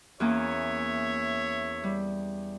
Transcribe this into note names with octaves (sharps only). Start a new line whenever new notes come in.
E2 A#3 C#4 C#5 E5
G3